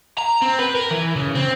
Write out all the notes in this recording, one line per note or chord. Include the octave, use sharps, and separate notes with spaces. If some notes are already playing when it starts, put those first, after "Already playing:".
A#5
C4
B4
A#4
E3
C#3
C4